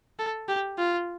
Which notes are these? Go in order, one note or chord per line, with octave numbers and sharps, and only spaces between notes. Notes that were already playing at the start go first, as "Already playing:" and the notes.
A4
G4
F4